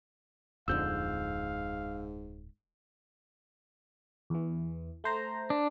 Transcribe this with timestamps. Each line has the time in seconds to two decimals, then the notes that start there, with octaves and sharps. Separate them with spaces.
0.68 D1 F2 G#2 D3 F5 E6 G6
4.30 E2 E3
5.04 A3 C5 A#5
5.50 D4